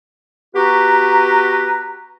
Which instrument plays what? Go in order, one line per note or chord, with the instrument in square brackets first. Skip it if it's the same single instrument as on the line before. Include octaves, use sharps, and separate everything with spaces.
[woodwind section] B3 F#4 G4 B4 A#5